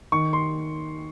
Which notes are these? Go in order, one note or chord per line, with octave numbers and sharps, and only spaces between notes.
D#3 C#6
C6